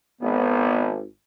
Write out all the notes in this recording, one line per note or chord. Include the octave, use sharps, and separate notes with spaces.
G#1 B3